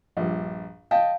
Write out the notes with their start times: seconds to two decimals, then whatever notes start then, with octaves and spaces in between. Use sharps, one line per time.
0.17 A#1 G2
0.91 D#5 F5 G5 A5